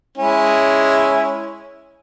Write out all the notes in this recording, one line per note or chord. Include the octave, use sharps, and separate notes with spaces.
G#3 C#4 E4